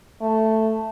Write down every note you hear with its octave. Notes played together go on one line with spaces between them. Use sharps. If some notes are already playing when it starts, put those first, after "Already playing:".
A3